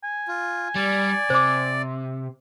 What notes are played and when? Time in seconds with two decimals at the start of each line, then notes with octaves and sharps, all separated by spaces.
0.04 G#5
0.28 F4
0.75 G3 D5
1.30 C3 C5 D6